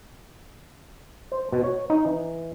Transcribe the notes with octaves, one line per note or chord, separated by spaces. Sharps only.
C5
B2
C#5
D#4
E3